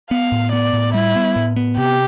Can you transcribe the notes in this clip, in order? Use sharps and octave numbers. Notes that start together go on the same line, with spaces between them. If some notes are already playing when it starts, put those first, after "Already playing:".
B3 F5
A2
B3 D5
A2
G3 E4
B3
A2
B3
C3 G4